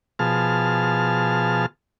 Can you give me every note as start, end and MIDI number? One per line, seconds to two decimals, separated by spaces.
0.19 1.66 47
0.19 1.66 53
0.19 1.66 68
0.19 1.66 81
0.19 1.66 89